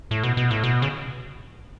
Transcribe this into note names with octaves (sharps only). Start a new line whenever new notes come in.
A2
B2
B2
A2
B2
C#3